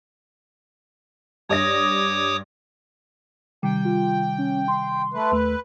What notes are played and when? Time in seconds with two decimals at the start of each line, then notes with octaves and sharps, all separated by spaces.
1.49 G2 C#5 D5 D6 D#6 A#6
3.63 C3 D#3 G3 G5
3.85 F4
4.38 C#4
4.68 C6
5.14 A3 B4
5.32 D#2 A3 B4